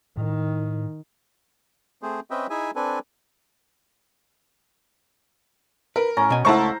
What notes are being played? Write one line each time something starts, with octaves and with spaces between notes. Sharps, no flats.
A2 D#3
A3 C4 G#4 C5
C4 C#4 B4 D#5 E5 G5
D#4 E4 G#4 E5 G#5
C4 D4 A4 B4 G#5
A#4 B4
A2 C#4 A#5
B2 G#5
C#2 A3 E4 C5 F#5 A5 A#5 C#6